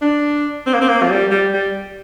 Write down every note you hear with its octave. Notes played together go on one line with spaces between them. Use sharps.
D4
C4
A#3
C4
A#3
F3
G3
G3
G3